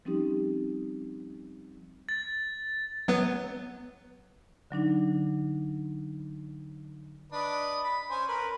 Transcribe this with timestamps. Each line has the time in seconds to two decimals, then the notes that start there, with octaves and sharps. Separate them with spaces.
0.05 F3 G3 C4 C#4 D#4 G4
2.09 A6
3.08 F#3 B3 B4
4.71 D3 F#3 D4 D#4
7.32 D4 B4 D#5
7.84 B5
8.11 C#4 C5 G#5
8.28 A#4 B4